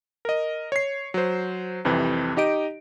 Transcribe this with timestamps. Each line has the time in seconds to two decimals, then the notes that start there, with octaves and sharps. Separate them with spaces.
0.25 A#4 D#5
0.72 C#5 C7
1.14 F#3 C5
1.85 C2 F2 C3 E3
2.37 D#4 G4 D#5 D7